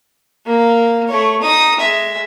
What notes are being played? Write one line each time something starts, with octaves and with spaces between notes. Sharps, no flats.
A#3
A3 C#5
D#4 D#6
G#3 E5